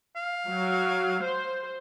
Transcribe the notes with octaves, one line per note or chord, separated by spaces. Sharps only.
F5
F#3
C5